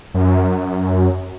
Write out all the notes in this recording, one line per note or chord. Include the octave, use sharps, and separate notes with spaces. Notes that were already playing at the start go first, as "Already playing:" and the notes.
F#2